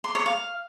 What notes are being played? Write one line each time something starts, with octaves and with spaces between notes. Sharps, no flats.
C6
C#5
F5